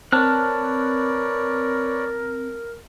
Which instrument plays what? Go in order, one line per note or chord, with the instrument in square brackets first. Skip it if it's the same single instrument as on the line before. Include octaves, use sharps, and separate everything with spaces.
[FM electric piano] C4 [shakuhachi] A#4 [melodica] B4 C#5 D5 [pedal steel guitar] A5 F6 F#6